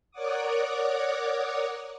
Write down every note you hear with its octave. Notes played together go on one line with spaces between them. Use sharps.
A#4 C#5 D5 F#5 D6 D#6